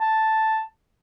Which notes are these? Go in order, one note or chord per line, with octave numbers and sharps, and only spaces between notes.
A5